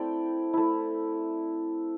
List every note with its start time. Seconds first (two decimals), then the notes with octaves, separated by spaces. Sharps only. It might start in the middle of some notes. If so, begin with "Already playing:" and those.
Already playing: A3 C4 E4 D5 G5
0.53 A3 E4